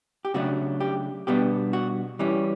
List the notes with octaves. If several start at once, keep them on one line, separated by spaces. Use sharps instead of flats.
G4
C#3 F#3 A3 D4 F#4
G4
B2 G3 B3 D4 G4
F#4
E3 G3 C#4